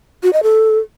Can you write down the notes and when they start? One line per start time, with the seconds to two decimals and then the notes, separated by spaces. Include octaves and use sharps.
0.23 F#4
0.33 D#5
0.43 A4